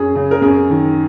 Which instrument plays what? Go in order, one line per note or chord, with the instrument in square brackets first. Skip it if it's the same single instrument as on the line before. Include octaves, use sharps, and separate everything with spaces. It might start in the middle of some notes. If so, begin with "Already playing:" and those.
Already playing: [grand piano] F#2 G#4
C#3
A#4
F#2 G#4
D#3